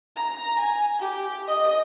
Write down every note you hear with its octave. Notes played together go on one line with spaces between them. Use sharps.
A#5
G#5
G4
D#5